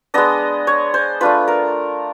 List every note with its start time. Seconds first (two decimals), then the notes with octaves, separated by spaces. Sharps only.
0.14 G#3 B3 D4 D#5
0.67 C#5
0.94 C5
1.21 A3 D4 F4 B4
1.48 A#4